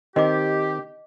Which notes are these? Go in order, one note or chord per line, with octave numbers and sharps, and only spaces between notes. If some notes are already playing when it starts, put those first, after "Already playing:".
D#3 C4 G4 D#5 D6